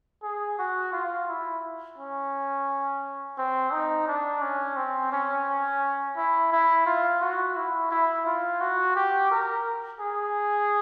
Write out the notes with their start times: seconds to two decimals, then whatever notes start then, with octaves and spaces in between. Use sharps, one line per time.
0.23 G#4
0.58 F#4
0.92 F4
1.28 E4
1.98 C#4
3.38 C4
3.72 D#4
4.08 D4
4.42 C#4
4.76 C4
5.12 C#4
6.17 E4
6.52 E4
6.86 F4
7.21 F#4
7.56 E4
7.91 E4
8.26 F4
8.60 F#4
8.95 G4
9.31 A#4
10.00 G#4